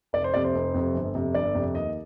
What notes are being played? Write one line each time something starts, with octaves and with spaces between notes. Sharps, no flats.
F1 D5
C5
F2 C3 D5
C5
F1
F2 C3
G1
F2 C3
G1 D5
F2 C3
D#2 D#5